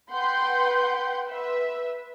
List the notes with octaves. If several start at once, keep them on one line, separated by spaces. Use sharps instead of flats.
B4 F#5 G5 C6 G6
B4 E5